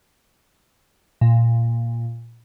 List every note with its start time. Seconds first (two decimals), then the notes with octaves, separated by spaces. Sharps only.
1.21 A#2